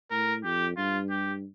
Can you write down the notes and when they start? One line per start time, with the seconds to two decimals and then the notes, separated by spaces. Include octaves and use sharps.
0.11 A2 A#4
0.44 F2 G4
0.77 G2 F4
1.10 G4